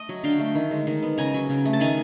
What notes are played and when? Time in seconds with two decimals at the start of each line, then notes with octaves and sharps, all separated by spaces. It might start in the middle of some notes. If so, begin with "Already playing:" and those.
Already playing: A3 D#5
0.09 F#3
0.24 D3 F5 G5
0.39 A3
0.55 D#3
0.71 G#3
0.87 D#3
1.02 B3
1.18 C#3 G#5 A#5
1.34 F#3
1.49 C#3
1.65 A3
1.73 A5
1.80 D#3 G#5 A#5